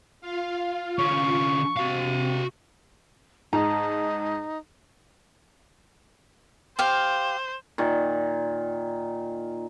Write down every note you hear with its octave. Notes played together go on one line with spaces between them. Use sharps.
F4 F5
D3 C#4 C#6
C3 F#4 F5
G#2 D#4 A5 A#5
G4 C5 F5
A#2 D#3